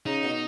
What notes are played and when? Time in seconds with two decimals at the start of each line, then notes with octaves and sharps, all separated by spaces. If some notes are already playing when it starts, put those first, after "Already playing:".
0.06 C#3 D#4
0.23 B2